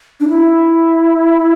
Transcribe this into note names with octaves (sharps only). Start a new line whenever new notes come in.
D4
E4